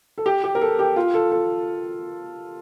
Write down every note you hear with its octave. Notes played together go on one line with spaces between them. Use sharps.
A4
G4
G4
A#4
A4
G4
F4
A4
A4